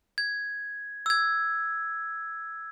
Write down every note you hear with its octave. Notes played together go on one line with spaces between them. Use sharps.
G#6
E6 G#6